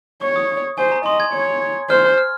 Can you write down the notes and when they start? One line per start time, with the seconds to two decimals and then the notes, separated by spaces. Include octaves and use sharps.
0.21 C#5 C#6
0.36 D#6
0.78 C5 G#5
0.92 A#5
1.05 D#5 C6
1.20 G#6
1.34 C#5
1.90 C5 F6
2.18 F6